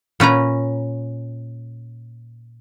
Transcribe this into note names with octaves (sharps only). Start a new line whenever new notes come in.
A#2 C#4 B4 A#5